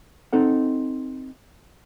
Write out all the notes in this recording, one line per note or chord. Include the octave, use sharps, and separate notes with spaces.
C4 D#4 A4 F#5